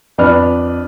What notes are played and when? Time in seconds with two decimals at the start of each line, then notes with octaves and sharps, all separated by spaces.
0.18 F2 D4 B4 F6